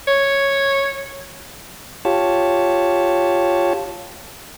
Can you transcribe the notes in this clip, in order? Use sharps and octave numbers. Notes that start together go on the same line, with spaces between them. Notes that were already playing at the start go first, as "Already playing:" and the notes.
C#5
F4 G4 C#5 A5